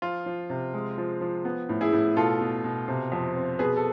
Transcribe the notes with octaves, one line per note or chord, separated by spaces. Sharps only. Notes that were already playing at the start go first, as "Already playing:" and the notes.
F3 F4
F3
C3
G#3
F3
F3
B3
A2
E4 G#4
A2
B2 F4 A4
B2
B2
C3
F2
C4
B2 G#4 B4
A4